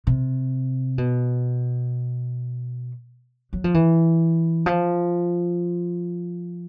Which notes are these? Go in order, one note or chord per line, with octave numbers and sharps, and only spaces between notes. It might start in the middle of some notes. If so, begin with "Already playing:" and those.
C3
B2
F#3
F3
E3
F3